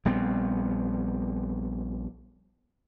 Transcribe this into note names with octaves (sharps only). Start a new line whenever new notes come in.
A#1 G3 B3 C4